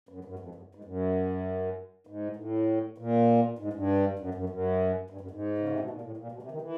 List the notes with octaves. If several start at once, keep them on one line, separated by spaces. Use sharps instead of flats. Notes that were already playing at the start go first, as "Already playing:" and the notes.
F#2
F#2
F2
F#2
G#2
F#2
G#2
A2
A#2
G#2
G2
F#2
F#2
F#2
G2
F#2
G#2
C#3
C3
B2
A#2
A2
A#2
B2
C3
D#3
E3